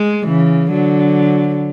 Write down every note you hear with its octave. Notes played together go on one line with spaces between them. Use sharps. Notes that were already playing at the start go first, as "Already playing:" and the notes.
Already playing: G#3
C#3 E3
D3 F#3